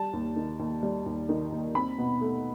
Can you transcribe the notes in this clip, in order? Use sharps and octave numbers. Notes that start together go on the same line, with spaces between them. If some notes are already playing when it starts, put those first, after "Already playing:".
Already playing: G3 A5
D#2
D#3
D#2
G3
D#2
D#3
D#2
C4 B5
B2
A3